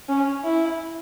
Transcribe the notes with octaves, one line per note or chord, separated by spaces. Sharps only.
C#4
E4